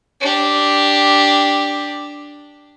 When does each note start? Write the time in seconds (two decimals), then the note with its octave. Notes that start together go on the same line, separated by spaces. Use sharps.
0.21 D4 G4